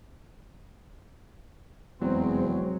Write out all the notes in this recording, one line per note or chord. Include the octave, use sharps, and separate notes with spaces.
F1 E2 F#3 G#3 C4